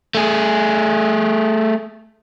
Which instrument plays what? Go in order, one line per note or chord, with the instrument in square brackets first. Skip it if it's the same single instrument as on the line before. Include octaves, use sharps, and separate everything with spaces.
[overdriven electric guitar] A3 G#4